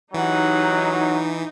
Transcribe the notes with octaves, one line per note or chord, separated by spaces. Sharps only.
E3 F#3 D#4 G4 F#5